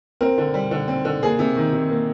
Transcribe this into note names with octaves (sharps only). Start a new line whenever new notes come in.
C4 A#4
D3
G3
D3
C4
D3
A#3 G#4
C3
D#3
C3
A#3